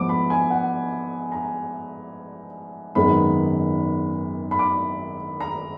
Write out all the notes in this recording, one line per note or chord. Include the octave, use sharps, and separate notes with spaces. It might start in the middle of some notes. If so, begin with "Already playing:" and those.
Already playing: G#2 F3 B3 D6
B5
G#5
F#5
A#5
G#1 F#2 D#3 G#3 B3 B5
B5
D6
A#5